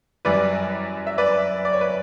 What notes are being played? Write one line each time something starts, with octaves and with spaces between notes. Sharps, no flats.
F#2 E3 G3 B4 D5
E5
B4 D5
D5
C#5
B4